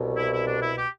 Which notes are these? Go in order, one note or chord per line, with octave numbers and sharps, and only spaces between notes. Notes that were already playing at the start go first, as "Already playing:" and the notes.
Already playing: C2 B2
E4
E4
D4
E4
G4